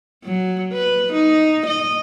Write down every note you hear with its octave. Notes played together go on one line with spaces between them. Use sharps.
F#3
B4
D#4
D#5